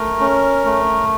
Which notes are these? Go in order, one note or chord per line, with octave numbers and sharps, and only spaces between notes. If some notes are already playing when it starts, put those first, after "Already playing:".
Already playing: A3 A#4
C#4
A3